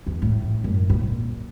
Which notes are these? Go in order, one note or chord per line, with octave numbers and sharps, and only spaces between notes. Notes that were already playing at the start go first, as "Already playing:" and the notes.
E2
A2
F#2
A#2